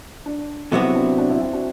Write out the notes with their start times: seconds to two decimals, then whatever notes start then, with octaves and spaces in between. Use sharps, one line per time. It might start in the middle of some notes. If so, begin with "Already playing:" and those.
0.26 D4
0.72 C3 F#3 B3 C4 E4 F#4
0.84 C4 E4
0.95 D4
1.07 C4
1.18 D4
1.30 C4 E4
1.41 C4 E4
1.53 D4 F#4